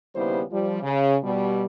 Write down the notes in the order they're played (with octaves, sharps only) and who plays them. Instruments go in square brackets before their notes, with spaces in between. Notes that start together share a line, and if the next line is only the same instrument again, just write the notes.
[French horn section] D#2 C#3 G3 B3 E4 C5
F3 G3
C#3
B2 G3